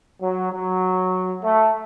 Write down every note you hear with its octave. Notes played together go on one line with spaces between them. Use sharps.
F#3
F#3
A3